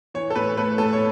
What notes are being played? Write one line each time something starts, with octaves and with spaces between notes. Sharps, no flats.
E3 C#5
A4
A2 B4
A3 B4
A2 A4
C#5